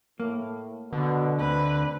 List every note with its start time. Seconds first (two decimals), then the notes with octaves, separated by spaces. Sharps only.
0.20 A2 A#3
0.93 B2 D3
1.39 D2 C4 B4